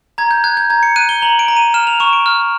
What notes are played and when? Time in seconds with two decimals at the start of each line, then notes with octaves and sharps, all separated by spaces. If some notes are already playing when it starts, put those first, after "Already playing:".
0.18 A#5 G#6
0.31 G6
0.44 F#6 G#6
0.57 G6
0.70 A#5 G#6
0.83 C#7
0.96 F#6 D#7
1.09 G7
1.22 A#5 F#7
1.39 D7
1.48 A#5
1.57 D#7
1.74 F6 E7
1.87 F7
2.00 C#6 E7
2.13 D7
2.26 F6